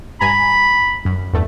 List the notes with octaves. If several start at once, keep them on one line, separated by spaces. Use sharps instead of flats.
G2 G#5 A#5 B5
F#2
E2 G2 A3